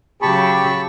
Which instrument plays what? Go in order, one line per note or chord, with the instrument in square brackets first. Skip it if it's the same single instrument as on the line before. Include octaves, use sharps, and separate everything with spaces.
[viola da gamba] C#3 F#3 [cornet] G4 [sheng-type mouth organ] A5 B5 C#6